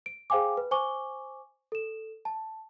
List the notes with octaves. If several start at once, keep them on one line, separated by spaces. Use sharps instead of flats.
D7
G#4 C5 F5 G5 G#5 D6
B4
C5 G#5 C#6 D6 G7
A4 E7
A5